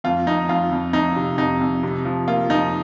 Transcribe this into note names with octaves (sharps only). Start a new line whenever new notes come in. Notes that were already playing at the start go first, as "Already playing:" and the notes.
F2 F4
F2 D#4
F2 F4
F2
F2 D#4
C3
F2 D#4
F2
C3
F3
A#3 F4
F3 D#4